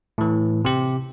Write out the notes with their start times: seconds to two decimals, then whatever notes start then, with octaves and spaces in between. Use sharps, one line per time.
0.18 A2 E3
0.65 C3 G4